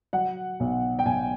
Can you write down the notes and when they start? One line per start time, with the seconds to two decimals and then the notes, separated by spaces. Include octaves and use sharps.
0.13 F#3 F#5
0.60 B1
0.99 G5
1.06 B1 G#5